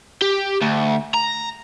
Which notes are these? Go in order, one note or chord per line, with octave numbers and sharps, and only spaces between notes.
G4
D2
A#5